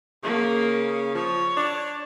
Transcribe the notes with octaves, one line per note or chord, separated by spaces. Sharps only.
C#3 A#3
F3 C#5
D4